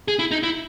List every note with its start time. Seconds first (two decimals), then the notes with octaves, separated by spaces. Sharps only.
0.08 G#4
0.19 E4
0.31 D#4
0.43 E4